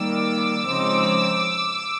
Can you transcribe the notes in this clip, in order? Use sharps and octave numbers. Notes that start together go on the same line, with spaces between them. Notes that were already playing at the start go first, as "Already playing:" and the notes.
Already playing: D#3 G3 A#3 D6 E6
C#3 F3 G#3 C4 D#4